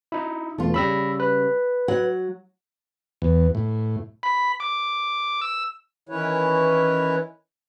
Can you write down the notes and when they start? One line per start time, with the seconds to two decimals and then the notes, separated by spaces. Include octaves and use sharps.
0.12 D#4 E4
0.58 B1 E2 A3 F4
0.74 C#3 G3 B5 E6 A#6
1.20 B4
1.88 F#3 F#5
3.22 E2
3.55 A2
4.23 B5
4.60 D6
5.41 E6
6.09 D#3 E3 C#4 E4 B4 C#5